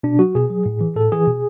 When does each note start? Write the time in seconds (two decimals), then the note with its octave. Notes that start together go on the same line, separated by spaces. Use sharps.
0.03 B2 D4
0.19 F#3 F#4
0.35 B2 G#4
0.50 F#3
0.66 A2
0.81 E3
0.96 A2 A4
1.12 E3 G#4
1.27 B2